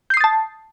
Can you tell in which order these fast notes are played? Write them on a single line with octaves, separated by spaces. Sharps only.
G6 C7 D#6 A6 A5